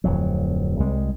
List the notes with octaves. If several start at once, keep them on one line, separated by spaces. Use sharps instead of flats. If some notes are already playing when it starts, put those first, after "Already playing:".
D1 F2 F#3
C2 G3 G#3